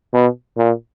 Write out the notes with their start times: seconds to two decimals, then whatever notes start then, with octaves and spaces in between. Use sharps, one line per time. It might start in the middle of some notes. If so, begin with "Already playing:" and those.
0.14 B2
0.58 A#2